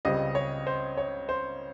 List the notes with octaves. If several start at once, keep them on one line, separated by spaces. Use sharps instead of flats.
C#2 C#3 G3 C4 D#5
C#5
C5
C#5
C5